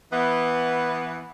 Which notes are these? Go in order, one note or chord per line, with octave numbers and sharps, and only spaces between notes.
E3 B3